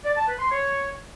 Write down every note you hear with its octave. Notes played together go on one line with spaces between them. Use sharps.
D5
A5
B4
C6
C#5